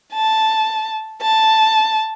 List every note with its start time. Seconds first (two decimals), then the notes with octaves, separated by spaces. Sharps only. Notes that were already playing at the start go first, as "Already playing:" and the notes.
0.13 A5
1.21 A5